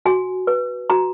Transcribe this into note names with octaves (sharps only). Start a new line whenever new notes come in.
F#4 G#5
B4
F#4 A#5